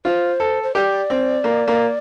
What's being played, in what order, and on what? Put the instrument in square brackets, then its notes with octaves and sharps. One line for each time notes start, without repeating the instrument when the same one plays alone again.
[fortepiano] F4 [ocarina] C5
[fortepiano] A4
[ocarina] C5
[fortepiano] G4 [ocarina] D5
[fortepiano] C4
A#3
A#3